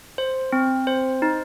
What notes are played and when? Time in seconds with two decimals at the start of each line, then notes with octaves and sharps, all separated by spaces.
0.18 C5
0.52 C4
0.87 C5
1.22 D#4